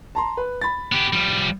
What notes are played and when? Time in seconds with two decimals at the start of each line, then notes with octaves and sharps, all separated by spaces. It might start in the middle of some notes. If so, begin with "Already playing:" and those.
0.15 A5 A#5 C6
0.37 B4
0.61 B5 A6
0.92 B3 G4
1.13 F3 G3